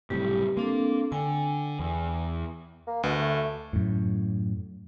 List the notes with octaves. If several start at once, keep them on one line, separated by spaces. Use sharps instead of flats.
F#1 A2 C3 G3 G4
A#3 C4 D4 A4
D3 G5 G#5
E2
A#3
D2 B2
A3
F#2 A2